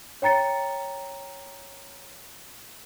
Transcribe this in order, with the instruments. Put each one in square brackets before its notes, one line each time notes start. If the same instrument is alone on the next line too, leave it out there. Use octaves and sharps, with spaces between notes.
[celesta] C#5 G5 A#5 A6 C#7